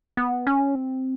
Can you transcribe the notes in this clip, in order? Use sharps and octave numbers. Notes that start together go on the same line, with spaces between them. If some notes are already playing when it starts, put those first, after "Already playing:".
B3
C#4
C4